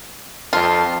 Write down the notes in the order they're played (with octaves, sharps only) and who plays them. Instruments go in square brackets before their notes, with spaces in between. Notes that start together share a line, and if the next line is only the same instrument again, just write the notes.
[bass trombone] F2 [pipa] F4 [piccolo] A5